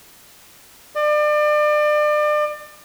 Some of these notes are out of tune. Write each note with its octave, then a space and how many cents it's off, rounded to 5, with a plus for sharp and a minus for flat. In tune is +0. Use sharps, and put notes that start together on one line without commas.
D5 +35